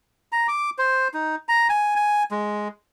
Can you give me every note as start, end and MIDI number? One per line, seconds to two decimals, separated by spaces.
0.32 0.47 82
0.48 0.70 86
0.78 1.08 72
1.14 1.35 63
1.49 1.68 82
1.69 1.96 80
1.96 2.23 80
2.31 2.68 56